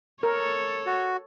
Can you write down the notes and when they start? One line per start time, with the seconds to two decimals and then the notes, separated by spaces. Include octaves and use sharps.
0.23 A4 A#4 C#5
0.86 F#4